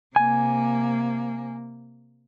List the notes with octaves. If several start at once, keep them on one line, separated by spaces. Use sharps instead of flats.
C3 A#3 G#5